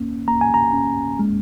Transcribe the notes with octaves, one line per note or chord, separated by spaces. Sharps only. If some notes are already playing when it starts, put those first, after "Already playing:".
Already playing: A#3 C#4
A#3 A#5
G#5
A#5
C#4
G#3